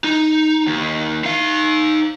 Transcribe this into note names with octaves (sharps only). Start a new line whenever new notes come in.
D#4
D#2
D#4 F5